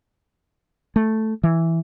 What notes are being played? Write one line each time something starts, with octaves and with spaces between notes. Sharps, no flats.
A3
E3